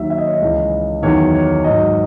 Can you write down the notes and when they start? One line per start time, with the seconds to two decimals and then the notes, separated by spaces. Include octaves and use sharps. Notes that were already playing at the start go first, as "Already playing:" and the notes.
Already playing: D#2 D#3 F#3 E5
0.10 E5
0.18 D#5
0.26 C#5
0.34 D#5
0.41 C#2 C#3 E3
1.02 E2 D#3 F#3 C#5
1.34 C#5
1.64 G#2 F#3 D#5